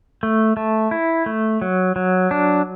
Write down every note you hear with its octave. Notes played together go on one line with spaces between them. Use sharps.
A3
A3
E4
A3
F#3
F#3
D4